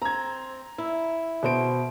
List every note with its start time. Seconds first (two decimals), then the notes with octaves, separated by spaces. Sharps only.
0.02 C4 A#5 G#6
0.78 E4
1.43 B2 C5 D7